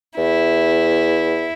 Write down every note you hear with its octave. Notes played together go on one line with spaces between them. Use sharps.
E2 E4